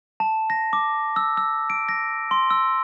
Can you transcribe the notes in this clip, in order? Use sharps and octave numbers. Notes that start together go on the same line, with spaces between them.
A5
A#6
D6
E6
E6
D7
A#6
C6
E6